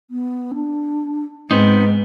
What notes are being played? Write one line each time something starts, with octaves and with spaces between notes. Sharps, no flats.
B3
D4
G#2 B3 C4 D#4 B4